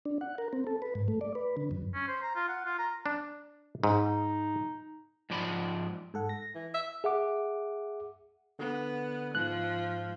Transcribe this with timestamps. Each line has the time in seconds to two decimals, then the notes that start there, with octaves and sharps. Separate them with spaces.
0.05 D4
0.21 F#5
0.38 A#4
0.53 C4
0.67 A4
0.82 B4
0.95 G#2
1.08 A3
1.21 D5
1.35 B4
1.57 D3
1.71 F#2
1.94 C#4
2.08 C5
2.22 A#5
2.35 F4
2.49 F#5
2.65 F4
2.79 A#5
3.06 D4
3.84 G#2 D#4
5.30 G#2 F3 D5 B5
6.14 G#2 A4 F#5
6.29 A#6
6.54 E3
6.74 E5
7.04 G#4 E5 F#5 D6
8.59 D3 B3
9.35 G#2 F3 F#6